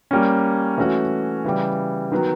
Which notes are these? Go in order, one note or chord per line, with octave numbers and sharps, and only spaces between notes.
G3 A#3 C#4
E3 A3 C#4 F#4
C#3 E3 G3
D#3 F#3 B3